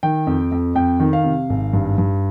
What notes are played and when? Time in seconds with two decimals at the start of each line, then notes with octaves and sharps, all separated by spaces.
0.03 D#3 G5
0.27 F2
0.52 F2
0.75 F2 G5
1.00 D#3
1.13 F5
1.24 C3
1.50 G#1
1.73 G2
1.98 G2